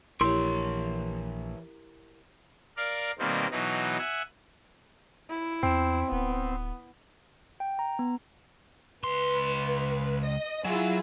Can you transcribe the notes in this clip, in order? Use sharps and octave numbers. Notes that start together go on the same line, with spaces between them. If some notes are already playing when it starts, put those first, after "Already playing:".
A#1 E3 E4 G4 A#4 C#5 C6
A#4 D5 F5
B2 D#3 G3 A#3 C4
B2 E3 F#3 D#4
E5 F#5 G#5
E4
E2 C4
D1 B3
G5
A#5
B3
C#2 B4 C6
D#5
F#3 E4 F4 G#4